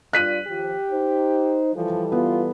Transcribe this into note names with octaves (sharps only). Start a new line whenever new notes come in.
G2 F4 D5 F#6 B6 D#7
D#2 F3 G4
D#4 C5
E3 F3 G3 A4
B3 F4